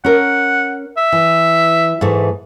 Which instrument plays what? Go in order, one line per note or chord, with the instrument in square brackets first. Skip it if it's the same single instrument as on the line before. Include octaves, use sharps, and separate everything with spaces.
[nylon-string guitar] C#4 A#4 [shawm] F#5
[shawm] E5
[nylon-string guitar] E3
G#2 E3 A3